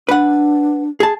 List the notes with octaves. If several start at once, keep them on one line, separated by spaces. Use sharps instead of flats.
D4 B4 F#5
G#4 A5